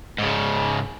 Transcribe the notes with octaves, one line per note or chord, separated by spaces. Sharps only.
G#2 C#3